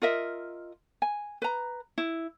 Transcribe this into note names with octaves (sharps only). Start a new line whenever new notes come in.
F4 A#4 D#5 E5
G#5
B4 A#5
E4